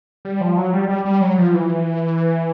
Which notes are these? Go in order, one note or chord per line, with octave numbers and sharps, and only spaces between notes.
G3
F3
F#3
G3
G3
G3
F#3
F3
E3